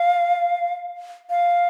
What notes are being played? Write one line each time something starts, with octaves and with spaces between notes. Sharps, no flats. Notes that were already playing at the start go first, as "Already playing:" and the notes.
Already playing: F5
F5